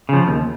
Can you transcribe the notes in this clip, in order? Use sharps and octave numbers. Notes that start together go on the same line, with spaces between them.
C#3 F3
D#2